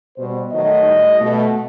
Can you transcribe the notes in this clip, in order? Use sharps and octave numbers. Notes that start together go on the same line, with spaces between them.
B2 G3 C5
D#3 F#3 A3 D#5
A2 G3
B2 A3